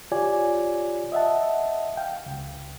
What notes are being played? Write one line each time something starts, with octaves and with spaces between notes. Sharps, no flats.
F4 G4 C#5 D5 G#5
D#5 E5 F#5 A5
F5 G5
C#2